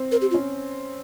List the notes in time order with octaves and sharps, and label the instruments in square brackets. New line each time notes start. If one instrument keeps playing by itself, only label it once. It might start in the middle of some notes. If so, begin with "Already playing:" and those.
Already playing: [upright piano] C4
[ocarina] A#4
G4
F4
[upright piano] C#4